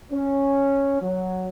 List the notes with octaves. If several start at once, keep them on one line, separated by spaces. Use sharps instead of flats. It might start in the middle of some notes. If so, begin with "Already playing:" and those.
C#4
F#3